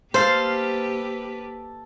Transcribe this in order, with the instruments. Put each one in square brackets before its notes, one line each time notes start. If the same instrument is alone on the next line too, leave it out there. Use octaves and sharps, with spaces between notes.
[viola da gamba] A#3 G4 B4 [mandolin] A4 F5 [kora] C5